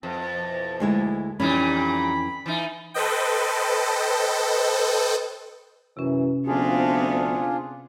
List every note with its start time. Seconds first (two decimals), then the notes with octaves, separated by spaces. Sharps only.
0.03 F2 G#2 E3 C4
0.35 B2 E3 F3
0.80 D2 G#3 E4
1.40 F2 A#2 E3 G3 C#4 D#4 B5
2.46 E3 D#4
2.94 A4 B4 C5 D#5 G5
5.97 F#2 C3 E3 C#4
6.47 D2 F3 B3 C4 D4 F4 G#4